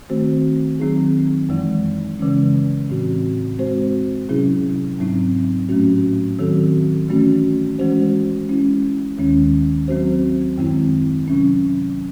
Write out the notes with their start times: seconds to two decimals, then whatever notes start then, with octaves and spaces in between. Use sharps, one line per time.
0.10 D#3 A3 C4 F#4 C5
0.79 D#3 F#3 C4 D#4 G#4
1.49 F#2 E3 G#3 D#4
2.19 C#3 E3 G#3 C#4
2.89 A2 E3 C4 F#4
3.59 G#3 C4 F#4 C5
4.29 C3 F#3 C#4 E4 G#4
4.99 G#2 F#3 C4 D#4
5.69 A2 F#3 A3 C#4 F#4
6.39 D#3 F#3 C4 F#4 A4
7.09 E3 A3 C#4 F#4
7.79 E3 G#3 C#4 F#4 C5
8.48 G#3 C#4 E4
9.18 D#2 D#3 G#3 C#4
9.88 F#3 C4 F#4 C5
10.58 F#2 D#3 G#3 C4 E4
11.28 C3 F#3 C#4